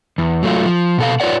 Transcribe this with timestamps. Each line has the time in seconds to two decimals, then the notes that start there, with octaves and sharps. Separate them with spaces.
0.18 E2
0.42 F#3 A3 F4
0.65 F3
0.98 B2 A4 F5
1.20 F4 B4 C#5 D5 F#5